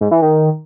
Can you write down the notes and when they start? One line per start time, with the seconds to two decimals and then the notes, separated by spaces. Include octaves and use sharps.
0.01 G#2
0.11 E3
0.22 D#3